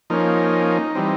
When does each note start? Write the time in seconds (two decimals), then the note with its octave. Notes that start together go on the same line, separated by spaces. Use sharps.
0.10 F3 A#3 C#4 D#4
0.95 E3 G3 C4